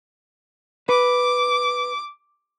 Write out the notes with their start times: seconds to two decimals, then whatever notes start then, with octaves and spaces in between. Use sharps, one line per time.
0.89 B4 D6